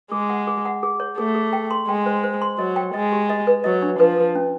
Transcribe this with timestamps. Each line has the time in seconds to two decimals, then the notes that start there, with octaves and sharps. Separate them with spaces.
0.11 G#3 G#4
0.30 F#5
0.47 G#4
0.65 F#5
0.83 G#4
1.00 C#5
1.18 A3 G#4
1.35 G#4
1.53 G5
1.71 C6
1.88 G#3 G5
2.06 C5
2.24 C5
2.42 C6
2.58 F#3 D#5
2.76 G5
2.94 G#3 D#5
3.12 G4
3.30 D#5
3.47 B4
3.64 F#3 D#5
3.82 D4
3.99 F3 B4
4.18 B4
4.35 C#4